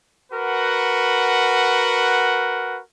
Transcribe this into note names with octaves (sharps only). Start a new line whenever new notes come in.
F#4 A#4 B4 F#5